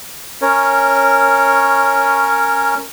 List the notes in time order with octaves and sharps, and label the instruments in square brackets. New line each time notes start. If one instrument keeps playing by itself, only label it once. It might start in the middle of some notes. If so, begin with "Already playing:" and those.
[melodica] C#4 A#4 C#5